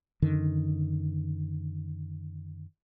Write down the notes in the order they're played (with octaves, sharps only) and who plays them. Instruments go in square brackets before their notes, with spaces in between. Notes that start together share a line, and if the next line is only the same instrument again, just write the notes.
[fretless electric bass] F#2 D3 D#3